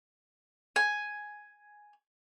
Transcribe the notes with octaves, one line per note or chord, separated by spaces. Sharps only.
G#5